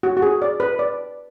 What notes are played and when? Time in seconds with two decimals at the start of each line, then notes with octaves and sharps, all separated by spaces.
0.03 F#4
0.17 F#4
0.22 G#4
0.42 D5
0.60 B4
0.79 D5